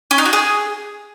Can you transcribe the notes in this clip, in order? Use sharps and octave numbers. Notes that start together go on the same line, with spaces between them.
C#4
D#4
F#4
G#4